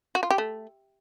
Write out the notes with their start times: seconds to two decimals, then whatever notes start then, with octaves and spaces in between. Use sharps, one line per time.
0.15 F#4
0.23 F4
0.30 G4
0.38 A3